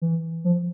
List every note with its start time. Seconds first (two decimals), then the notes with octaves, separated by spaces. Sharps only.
0.02 E3
0.44 F3